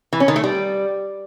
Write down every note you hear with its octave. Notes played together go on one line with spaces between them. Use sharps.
E3
C#4
D#3
A3
G3